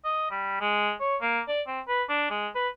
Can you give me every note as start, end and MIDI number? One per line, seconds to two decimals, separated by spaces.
0.04 0.28 75
0.31 0.57 55
0.60 0.92 56
1.00 1.16 73
1.21 1.41 58
1.48 1.61 74
1.67 1.80 60
1.88 2.03 71
2.09 2.27 62
2.30 2.48 56
2.55 2.68 71